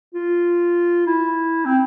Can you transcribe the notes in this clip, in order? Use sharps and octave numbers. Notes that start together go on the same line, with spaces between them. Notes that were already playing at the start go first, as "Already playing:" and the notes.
F4
E4
C4